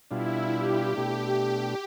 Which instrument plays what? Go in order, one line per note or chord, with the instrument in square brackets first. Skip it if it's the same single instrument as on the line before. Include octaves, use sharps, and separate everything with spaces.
[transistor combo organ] B2 G3 D4 F4 [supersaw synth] E4
[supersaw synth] G4
[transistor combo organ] B2 A3 D4